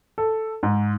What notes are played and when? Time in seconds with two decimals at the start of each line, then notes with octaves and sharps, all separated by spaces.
0.18 A4
0.63 G#2